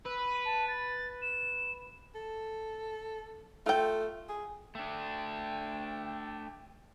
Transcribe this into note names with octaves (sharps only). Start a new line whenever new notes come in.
B4 E6
D#7
A5
A6
E7
A4
A3 F4 G5
G#4
A3 D4 G5